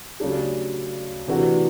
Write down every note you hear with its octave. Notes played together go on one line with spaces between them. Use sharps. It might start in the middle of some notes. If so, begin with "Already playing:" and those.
C#3 F#3 A3 D4 G4
C3 E3 A3 D4 F#4